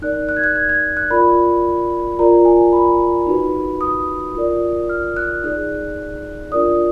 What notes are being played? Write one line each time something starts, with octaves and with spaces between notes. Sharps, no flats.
D#4 A#4 D5 F#6
F#6
G#6
F#6
G#6
G#6
F#6
F4 A#4 D5 B5
F4 A#4 D5 A#5
G#5
B5
D#4 F#4 B4
D#6
F4 A#4 D5
F6
F#6
D#4 G#4 D5 F#6
D4 F4 A#4 D5 D#6